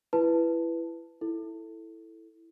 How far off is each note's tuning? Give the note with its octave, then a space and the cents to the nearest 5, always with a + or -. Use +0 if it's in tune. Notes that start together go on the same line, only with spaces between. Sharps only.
E4 +20 B4 +0 A5 +0
E4 +0 A4 +5